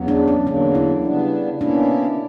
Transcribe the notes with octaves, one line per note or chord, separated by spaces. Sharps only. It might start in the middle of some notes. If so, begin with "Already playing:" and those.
Already playing: E2 C#3 F#3 B3
D4
C#4
E2 D3 F#3 A#3 D4
E4
C#3 G3 B3 D4
B2 A#3 C#4 D4 E4